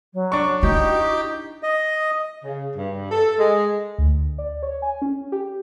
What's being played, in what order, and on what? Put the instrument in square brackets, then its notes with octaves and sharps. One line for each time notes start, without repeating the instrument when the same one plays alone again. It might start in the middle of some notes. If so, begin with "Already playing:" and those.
[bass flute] F#3
[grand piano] D4 C#6
[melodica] D#4 G4 G5 [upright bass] E4 [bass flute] F#4
[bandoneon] D#5
[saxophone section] C#3
G2
A4
G#3
[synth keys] D2
D5
C#5
G#5
C#4
G4